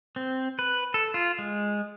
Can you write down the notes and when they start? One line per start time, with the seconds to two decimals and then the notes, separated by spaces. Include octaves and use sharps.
0.16 C4
0.59 B4
0.94 A4
1.14 F4
1.39 G#3